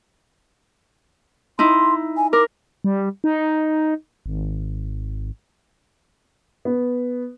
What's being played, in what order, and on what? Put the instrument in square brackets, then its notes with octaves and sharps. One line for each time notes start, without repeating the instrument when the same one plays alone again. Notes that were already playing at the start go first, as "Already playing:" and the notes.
[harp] D#4 E4 [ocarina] C6
[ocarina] G#5
[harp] A#4 [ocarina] D6
[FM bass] G3
D#4
G#1
[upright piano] B3